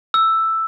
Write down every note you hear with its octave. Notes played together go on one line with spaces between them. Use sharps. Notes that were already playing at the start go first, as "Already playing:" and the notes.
E6